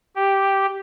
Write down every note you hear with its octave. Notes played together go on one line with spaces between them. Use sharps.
G4